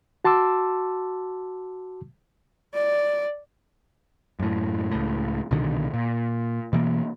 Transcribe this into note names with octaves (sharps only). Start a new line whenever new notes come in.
F#4 A5 C6 D6 E6
D5
F#2 A2
C#2 A2
C2 B2 D3 D#3
A#2
B2 E3 A#3